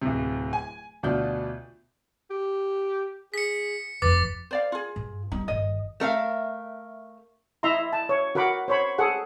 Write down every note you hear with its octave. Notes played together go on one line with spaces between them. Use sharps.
D1 C3
G#5
D2 B2 D4 F4 G6
G4
G#4 B6 C#7
F1 F2 B4 D6 A6
C5 D5 F5
F4 G#4
G2
G3 B3 D#4
G1 D#3 D#5
A3 A#4 E5 F5
E4 D#5 E5 A#5 C6
A5
C#5
F#4 A#4 F#5 B5 D6
C5 C#5 B5
G#4 A4 F#5